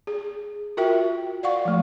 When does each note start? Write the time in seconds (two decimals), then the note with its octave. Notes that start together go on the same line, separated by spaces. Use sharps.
0.07 G#4
0.77 F4 F#4 A#4 E5 G5
1.43 D5 F5 F#5 C#6
1.65 F3 A3